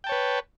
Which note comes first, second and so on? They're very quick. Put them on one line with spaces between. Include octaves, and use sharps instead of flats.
G5 A5 C#5 B4